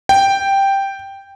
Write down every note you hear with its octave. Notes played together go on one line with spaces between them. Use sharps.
G5